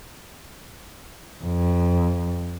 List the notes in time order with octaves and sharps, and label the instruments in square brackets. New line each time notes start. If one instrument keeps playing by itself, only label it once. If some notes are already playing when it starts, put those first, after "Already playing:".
[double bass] F2